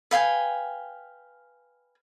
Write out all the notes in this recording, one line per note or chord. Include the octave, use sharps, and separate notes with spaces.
B4 F5 G5 G#5